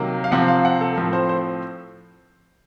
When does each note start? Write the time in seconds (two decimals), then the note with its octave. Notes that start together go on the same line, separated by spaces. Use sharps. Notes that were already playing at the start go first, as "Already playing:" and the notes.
Already playing: C3 D#3 F#3 A#3
0.24 F5
0.31 C3 F3 C4 F#5
0.48 F5
0.65 F#5
0.81 A4
0.96 A2 F3 C4 A#4
1.13 C5
1.29 C5